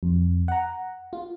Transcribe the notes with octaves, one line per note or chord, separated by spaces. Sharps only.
F2
F#5 A#5
F4